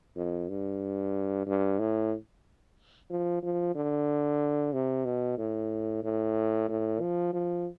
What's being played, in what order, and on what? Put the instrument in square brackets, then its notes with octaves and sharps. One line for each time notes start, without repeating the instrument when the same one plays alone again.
[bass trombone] F2
G2
G2
A2
F3
F3
D3
C3
B2
A2
A2
A2
F3
F3